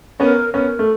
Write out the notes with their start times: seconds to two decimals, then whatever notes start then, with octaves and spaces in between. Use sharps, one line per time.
0.20 B3 C#4 A#4
0.54 B3 C#4 A#4
0.79 A3